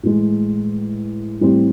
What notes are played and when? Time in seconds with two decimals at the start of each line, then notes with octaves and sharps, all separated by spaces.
0.03 A2 E3 G#3
1.41 A2 E3 G3 C4